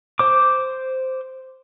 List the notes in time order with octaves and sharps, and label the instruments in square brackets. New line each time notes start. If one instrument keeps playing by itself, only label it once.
[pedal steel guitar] C5 D6